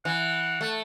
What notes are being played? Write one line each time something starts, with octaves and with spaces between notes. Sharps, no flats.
E3 F#5
A3